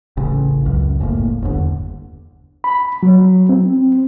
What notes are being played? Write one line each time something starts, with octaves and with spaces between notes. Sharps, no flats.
A1 C#3
C#2 F#2
F#1 A2 C#3 A#3
G1 E2 D3
B5
F#3
C4